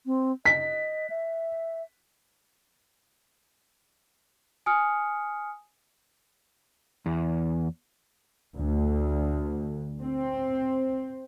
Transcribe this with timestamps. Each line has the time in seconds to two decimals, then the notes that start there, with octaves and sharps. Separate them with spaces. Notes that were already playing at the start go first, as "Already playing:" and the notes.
0.06 C4
0.45 D#5 B6
1.10 E5
4.66 G#5 D#6 F6 C#7
7.06 E2
8.55 D2
10.00 C4